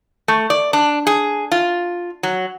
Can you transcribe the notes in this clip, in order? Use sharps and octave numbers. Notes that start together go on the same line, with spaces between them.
A3
D5
D4
G#4
F4
F#3